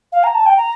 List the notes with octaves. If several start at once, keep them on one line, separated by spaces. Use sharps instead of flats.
F5
A#5
A5
G5
A#5